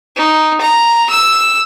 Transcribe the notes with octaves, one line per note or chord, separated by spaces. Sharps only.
D#4
A#5
E6